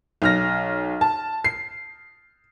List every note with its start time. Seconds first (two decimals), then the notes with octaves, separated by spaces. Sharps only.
0.22 B1 F6 A#6
1.01 A5
1.44 C7